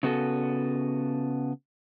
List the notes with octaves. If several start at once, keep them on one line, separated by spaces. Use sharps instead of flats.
C#3 B3 F#4 A4